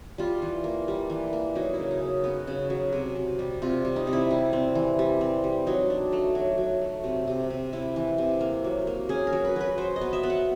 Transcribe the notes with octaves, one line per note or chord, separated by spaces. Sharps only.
G3 F4
E3
A#3
G3
E3
A#3
F#3 D#4
E4
C#3
D#4
C#3
B3 F#4
C#3
F#3
C3
C3
G3
C3 F4
G3
D#4
C3
E4
G3
C4
E3
G3
C4
G3
F#3 D#4
D4
A3
F#3
F#3
A3
C3
C3
C3
C3 E4
E3
C3
A#3
F#3
A#3
C#4 G#4
A#4
F#3
B4
F#3 B4
F#3 C5
D#5
B3
E5
B3
F#5